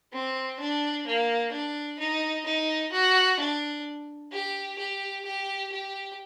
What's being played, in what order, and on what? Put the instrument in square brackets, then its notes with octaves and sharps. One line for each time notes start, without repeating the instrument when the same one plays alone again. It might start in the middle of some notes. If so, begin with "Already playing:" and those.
[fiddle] C4
D4
A#3
D4
D#4
D#4
F#4
D4
G4
G4
G4
G4